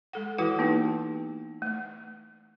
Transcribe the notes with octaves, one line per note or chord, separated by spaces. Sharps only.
G#3 A4 F#5
E3 E4 F#4 B4 F#5
A#3 B3 D#4 G4
A3